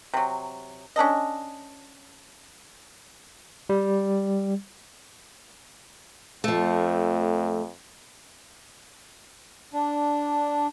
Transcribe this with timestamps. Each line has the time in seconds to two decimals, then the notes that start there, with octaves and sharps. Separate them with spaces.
0.14 C3 F#3
0.96 C#4 D4 A4 D#5
3.69 G3
6.44 F2 F3 A3
9.73 D4